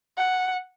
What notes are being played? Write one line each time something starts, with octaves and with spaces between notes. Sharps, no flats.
F#5